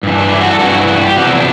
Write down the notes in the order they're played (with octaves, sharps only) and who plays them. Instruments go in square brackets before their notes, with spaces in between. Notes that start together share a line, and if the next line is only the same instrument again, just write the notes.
[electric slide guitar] G2 E3
D4
E4
F#4
A4
G2 E3 F#4
F#4
E4
F#4
G4
E2 C3 F#4
E4
D4